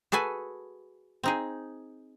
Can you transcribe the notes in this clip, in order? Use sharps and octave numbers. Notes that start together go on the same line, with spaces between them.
F#4 G#4 A4 B4 G#5
C4 D#4 G#4